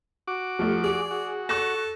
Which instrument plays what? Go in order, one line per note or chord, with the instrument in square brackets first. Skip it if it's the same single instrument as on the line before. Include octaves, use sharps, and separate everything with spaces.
[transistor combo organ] F#4 D6
[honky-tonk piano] F3 G3 A3
[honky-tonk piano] G#4 [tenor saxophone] D5
[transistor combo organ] F#4
[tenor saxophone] A4 [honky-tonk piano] C#6 F#6 A#6